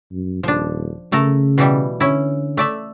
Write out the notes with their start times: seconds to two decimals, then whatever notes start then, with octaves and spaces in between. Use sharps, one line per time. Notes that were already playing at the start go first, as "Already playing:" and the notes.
0.12 F#2
0.43 D#1 F3 D4
1.12 C#3 A3 A4 A#4
1.58 B2 E3 G3
2.00 D3 C#4 E4
2.57 A3 D5 E5